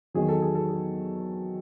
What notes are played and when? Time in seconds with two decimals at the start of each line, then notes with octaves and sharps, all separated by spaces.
0.14 E2 D#3 F#3 G#4
0.29 A4
0.42 G#4
0.55 A4
0.69 G#4